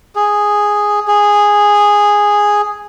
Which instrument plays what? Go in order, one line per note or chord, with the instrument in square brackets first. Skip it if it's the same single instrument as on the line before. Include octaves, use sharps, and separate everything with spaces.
[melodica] G#4
G#4